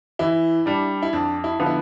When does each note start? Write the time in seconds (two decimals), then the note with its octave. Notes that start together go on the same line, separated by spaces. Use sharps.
0.19 E3 E4
0.66 G3 D4
1.03 E4
1.13 F2 D4
1.44 E4
1.59 D3 F3 B3
1.66 E4